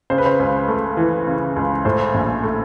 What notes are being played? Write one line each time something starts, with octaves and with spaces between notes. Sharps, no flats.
C#3 C5
B4
C5
C#2
A3
E3
C#3
C#2
A2 C5
A#1
A3